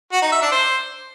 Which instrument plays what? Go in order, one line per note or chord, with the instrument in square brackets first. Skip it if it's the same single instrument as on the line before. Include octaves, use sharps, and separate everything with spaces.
[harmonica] F#4
D#4
E5
D4
C5